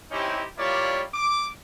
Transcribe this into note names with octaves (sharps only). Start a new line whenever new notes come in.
C4 C#4 D#4 E4 G4
G3 A#3 E4 F4 C#5 D5
D6